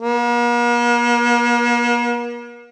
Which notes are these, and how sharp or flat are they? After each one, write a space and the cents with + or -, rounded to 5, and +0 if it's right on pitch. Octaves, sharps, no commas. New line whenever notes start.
A#3 +45